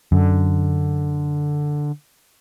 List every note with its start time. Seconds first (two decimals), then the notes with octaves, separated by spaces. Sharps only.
0.12 F#2 D3